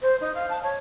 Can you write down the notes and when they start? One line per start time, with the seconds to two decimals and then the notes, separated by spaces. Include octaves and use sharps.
0.02 C5
0.20 D#4
0.34 F5
0.49 A5
0.62 C#5